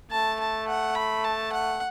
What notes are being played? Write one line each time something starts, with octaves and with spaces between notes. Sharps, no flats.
A3 A5
A5
F#5
B5
A5
F#5